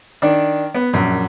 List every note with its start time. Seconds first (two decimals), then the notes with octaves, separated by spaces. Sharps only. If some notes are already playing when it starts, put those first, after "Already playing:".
0.22 D#3 D4
0.74 B3
0.93 A#1 F#2